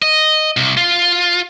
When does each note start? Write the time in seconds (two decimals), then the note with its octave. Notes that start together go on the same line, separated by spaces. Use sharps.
0.02 D#5
0.57 C2
0.77 F4